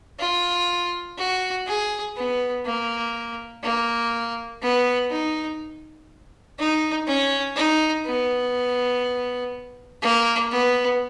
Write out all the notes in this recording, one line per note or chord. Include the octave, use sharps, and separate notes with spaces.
F4
F#4
G#4
B3
A#3
A#3
B3
D#4
D#4
C#4
D#4
B3
A#3
B3